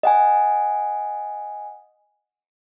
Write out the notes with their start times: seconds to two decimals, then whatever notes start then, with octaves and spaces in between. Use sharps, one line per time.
0.03 D#5 F#5 G#5